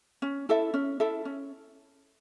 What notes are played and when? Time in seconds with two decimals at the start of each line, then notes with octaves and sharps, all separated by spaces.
0.22 C#4
0.49 E4 A4 E5
0.74 C#4
1.00 E4 A4 E5
1.25 C#4